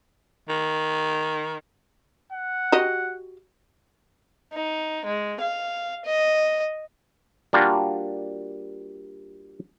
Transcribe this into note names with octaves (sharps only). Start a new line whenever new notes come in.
D#3
F#5
F#4 G4 D#5
D#4
G#3
F5
D#5
G3 A#3 D4 F4 F#4